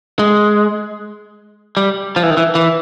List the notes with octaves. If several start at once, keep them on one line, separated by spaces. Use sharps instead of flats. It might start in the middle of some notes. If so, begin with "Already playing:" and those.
G#3
G3
F3
E3
D#3
E3
E3